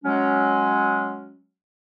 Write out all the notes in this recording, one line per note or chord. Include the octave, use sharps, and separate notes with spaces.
F#3 G#3 C#4